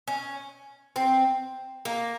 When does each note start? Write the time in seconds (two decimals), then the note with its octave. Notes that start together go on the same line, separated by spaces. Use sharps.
0.08 C#4
0.96 C4
1.85 A#3